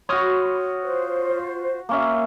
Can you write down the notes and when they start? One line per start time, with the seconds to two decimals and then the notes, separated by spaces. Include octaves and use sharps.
0.09 F#4 C#5 B5 C6 D#6 F6
0.83 F4 C5
1.89 A#3 C#4 E5 F5